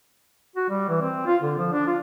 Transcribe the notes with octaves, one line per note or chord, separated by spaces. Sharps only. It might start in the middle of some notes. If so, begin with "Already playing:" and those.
F#4
G3
E3
C4
F4
D3
F3
D4
F4